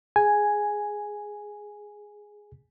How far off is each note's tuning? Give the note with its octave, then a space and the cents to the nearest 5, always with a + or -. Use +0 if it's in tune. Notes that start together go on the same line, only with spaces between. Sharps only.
G#4 +0 G#5 +0